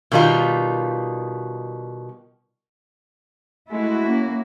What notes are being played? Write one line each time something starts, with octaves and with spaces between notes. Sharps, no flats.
B2 D#3 G3 D#4 F4
G#3 A3 E4 F#4
A#3 C#4